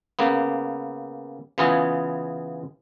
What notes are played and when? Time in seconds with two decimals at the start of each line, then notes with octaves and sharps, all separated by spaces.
0.19 C#3 A#3 B3
1.58 C#3 E3 B3 F4 G#4